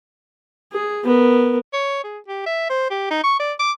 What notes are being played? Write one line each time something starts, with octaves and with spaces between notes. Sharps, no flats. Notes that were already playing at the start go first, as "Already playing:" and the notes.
G#4
B3 A#4
C#5
G#4
G4
E5
C5
G4
D#4
C#6
D5
D6